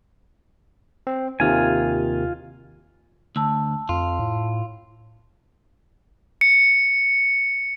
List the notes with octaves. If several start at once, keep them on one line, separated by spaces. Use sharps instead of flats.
C4
D#2 C3 D#3 F4 G#5
D2 A5 E6
F2 F4
A2
C#7